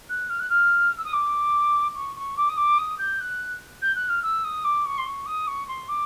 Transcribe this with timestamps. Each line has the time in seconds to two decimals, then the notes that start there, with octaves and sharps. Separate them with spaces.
0.09 F#6
0.29 F6
0.39 F#6
0.49 F6
0.97 E6
1.04 D#6
1.12 D6
1.95 C#6
2.16 C#6
2.37 D6
2.49 D#6
2.57 D6
2.78 D#6
2.98 G6
3.20 F#6
3.82 G6
3.95 F#6
4.09 F6
4.22 E6
4.44 D#6
4.64 D6
4.85 C#6
4.98 C6
5.05 C#6
5.26 D#6
5.47 C#6
5.67 C6
5.88 D6